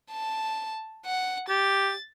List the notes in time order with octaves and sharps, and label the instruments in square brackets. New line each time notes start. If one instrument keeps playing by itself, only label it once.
[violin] A5
F#5
[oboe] G4 [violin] A6